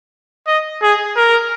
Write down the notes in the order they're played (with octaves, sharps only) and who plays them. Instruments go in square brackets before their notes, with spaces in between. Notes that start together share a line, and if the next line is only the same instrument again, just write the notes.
[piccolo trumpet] D#5
G#4
A#4